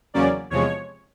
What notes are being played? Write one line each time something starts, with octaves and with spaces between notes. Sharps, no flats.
E2 C#3 F#3 A#3 C#4 D5
E2 C3 F3 G#3 C#5